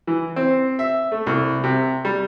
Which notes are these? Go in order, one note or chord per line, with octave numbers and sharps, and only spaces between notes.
E3
C4
E5
A3
C2
C3
G3